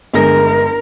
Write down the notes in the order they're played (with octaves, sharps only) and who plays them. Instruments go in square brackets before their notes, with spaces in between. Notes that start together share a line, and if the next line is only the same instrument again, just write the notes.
[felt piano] G1 G#3 A#6 [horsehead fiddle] A#4